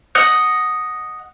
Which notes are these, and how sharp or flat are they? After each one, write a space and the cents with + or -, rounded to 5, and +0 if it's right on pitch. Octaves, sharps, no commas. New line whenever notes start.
D#5 +0 F#5 +0